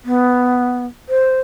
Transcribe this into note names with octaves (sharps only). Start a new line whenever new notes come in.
B3
C5